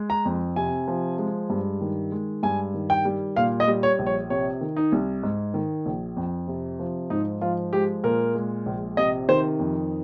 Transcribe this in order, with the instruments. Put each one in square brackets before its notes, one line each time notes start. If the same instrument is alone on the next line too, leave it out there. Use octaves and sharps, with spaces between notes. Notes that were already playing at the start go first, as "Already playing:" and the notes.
Already playing: [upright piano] G#3
A#5
F2
C3 G#5
F3
G#3
G2
D#3
G#3
G2 G#5
D#3
G5
G3
A#2 F5
D#5
G3
C#5
A#1
C#5
C3 C#5
D#3
D#4
C2
G#2
D#3
A#1
F2
C3
F3
G#2 D#4
F3 F4
G#3 G4
A#2 A#4
G#3
A#1
C3 D#5
D#3 C5
F2